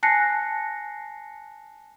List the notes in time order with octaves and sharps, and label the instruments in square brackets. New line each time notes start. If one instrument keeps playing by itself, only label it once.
[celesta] G#5 A5 F#6 A#6 C7 C#7